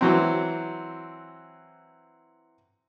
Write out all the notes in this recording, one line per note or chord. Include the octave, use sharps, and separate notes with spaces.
E3 F#3 C4